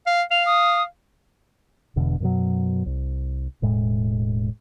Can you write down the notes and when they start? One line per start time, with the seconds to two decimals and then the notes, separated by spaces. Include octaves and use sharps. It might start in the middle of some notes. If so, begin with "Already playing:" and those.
0.06 F5
0.31 F5 F7
0.46 D#6
1.96 E1 E2 B2 D3
2.20 F#2 B2 F#3
2.86 C2
3.62 E1 A2 G#3